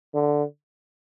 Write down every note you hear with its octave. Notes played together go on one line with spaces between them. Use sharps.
D3